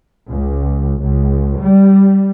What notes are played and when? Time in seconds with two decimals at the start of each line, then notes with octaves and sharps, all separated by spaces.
0.29 C#2
1.02 C#2
1.60 G3